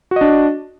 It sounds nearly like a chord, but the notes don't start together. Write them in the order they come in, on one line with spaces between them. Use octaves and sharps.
F#4 D#5 D4